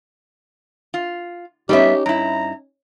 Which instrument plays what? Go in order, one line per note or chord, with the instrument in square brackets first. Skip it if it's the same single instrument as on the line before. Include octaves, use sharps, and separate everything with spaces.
[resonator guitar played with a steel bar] F4
[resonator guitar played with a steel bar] G3 B3 E5 [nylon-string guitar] C#4 D#4 [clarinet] G4
[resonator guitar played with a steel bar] G2 E4 [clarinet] A#5